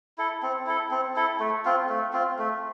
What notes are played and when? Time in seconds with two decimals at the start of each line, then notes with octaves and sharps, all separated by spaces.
0.18 E4 A4
0.42 C4
0.66 E4 A4
0.91 C4
1.16 E4 A4
1.40 A3
1.65 C4 F4
1.89 A3
2.13 C4 F4
2.39 A3